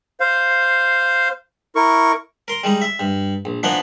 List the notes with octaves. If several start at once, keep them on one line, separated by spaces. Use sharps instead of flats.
C5 F5
E4 A#4 C#6
A#4 C6
G3 G#3 D#4
E5
G2
A#1
E3 F3 A#3 B3 D4 D#4